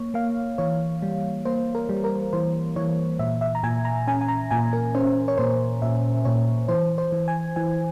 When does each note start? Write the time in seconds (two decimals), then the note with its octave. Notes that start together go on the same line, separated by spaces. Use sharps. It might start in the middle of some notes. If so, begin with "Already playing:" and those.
Already playing: A#3 C#5
0.14 A#3 F5
0.58 E3 C#5
1.02 G3
1.45 A#3 C5
1.75 A#4
1.89 G3
2.04 A#4
2.33 E3 C5
2.76 E3 C#5
3.19 A#2 E5
3.41 E5
3.55 A#5
3.63 A#2 G#5
3.85 A#5
4.07 C#4 G#5
4.21 G#5
4.28 A#5
4.51 A#2 G#5
4.73 A#4
4.95 C#4 C5
5.28 C#5
5.37 A#2 C5
5.82 A#2 E5
6.25 A#2 C#5
6.68 E3 C5
6.98 C5
7.12 E3
7.28 G#5
7.56 E3 G#5